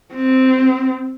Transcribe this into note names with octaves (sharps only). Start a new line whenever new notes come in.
C4